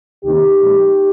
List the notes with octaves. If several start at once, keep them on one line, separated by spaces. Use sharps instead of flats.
D2 C3 D#3 A#3 D#4 G4
A#2 F3 G#3